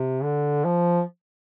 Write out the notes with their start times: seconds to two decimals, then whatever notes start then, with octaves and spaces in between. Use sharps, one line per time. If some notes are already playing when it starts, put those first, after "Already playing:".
Already playing: C3
0.23 D3
0.65 F3